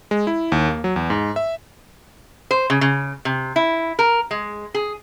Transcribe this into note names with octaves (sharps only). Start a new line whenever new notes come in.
G#3
E4
D#2
A#3
F#3
E2
G#2
E5
C5
C#3
C#3
C3
E4
A#4
G#3
G#4